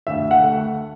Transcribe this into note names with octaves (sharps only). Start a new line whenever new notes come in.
D2 E5
F#5
A3